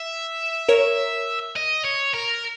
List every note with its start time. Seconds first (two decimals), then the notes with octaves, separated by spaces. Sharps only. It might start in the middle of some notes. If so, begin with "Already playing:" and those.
Already playing: E5
0.69 A#4 C#5
1.56 D#5
1.85 C#5
2.14 A#4